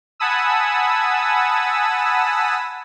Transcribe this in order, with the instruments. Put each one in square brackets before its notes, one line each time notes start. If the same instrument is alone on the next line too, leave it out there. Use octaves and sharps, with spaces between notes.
[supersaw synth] F#5 G#5 A5 B5 D#6 E6